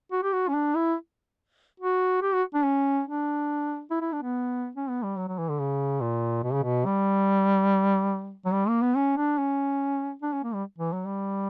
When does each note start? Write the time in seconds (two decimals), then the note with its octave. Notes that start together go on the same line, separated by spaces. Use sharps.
0.12 F#4
0.23 G4
0.33 F#4
0.48 C#4
0.53 D4
0.75 E4
1.80 F#4
2.22 G4
2.33 F#4
2.54 D4
2.64 C#4
3.07 D4
3.91 E4
4.01 E4
4.12 D4
4.22 B3
4.75 C#4
4.89 B3
5.03 G3
5.17 F#3
5.28 F#3
5.38 E3
5.49 D3
5.59 C#3
6.01 A#2
6.44 B2
6.53 C#3
6.63 B2
6.85 G3
8.45 F#3
8.54 G3
8.68 A#3
8.82 B3
8.96 C#4
9.17 D4
9.38 C#4
10.22 D4
10.33 C#4
10.43 A#3
10.54 G3
10.78 E3
10.92 F#3
11.06 G3